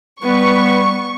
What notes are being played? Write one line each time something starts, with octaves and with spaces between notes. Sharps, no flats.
G3 B3 B4 C#6